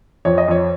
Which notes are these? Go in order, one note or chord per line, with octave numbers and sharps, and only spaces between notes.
F2 C#5
D#5
F2 C#5